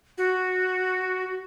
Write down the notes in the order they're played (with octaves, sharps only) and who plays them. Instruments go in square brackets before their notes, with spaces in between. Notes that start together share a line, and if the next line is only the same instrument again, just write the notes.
[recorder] F#4